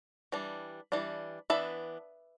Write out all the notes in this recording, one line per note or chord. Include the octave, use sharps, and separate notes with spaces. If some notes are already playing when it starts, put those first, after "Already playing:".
E3 G3 D4
E3 G3 D4
E3 B3 D4 B4 E5